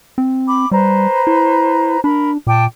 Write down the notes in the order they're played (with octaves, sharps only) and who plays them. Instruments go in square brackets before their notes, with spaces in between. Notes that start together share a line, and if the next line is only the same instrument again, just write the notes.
[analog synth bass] C4
[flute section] B5 D6
[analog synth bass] G3 [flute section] B4 C5 A#5
[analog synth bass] E4
[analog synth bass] D4 [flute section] A#4 B5
[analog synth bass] A#2 [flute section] G5 A5 D6